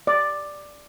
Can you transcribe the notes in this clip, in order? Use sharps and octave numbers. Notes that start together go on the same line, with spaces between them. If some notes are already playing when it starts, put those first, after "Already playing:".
D5